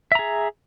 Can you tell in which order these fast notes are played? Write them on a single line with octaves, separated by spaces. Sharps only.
E5 A#5 G#4